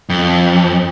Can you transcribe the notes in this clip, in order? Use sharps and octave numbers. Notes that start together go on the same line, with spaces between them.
F2